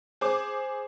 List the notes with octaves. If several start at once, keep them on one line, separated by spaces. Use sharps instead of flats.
G#4 C5 D6